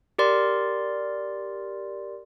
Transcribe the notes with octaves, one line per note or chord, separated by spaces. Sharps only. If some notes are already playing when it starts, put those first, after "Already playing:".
G4 A#4 D5 C6